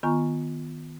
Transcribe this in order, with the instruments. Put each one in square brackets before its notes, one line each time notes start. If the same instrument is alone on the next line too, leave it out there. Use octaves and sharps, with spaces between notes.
[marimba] D#3 B3 F4 G#5 A#5 C#6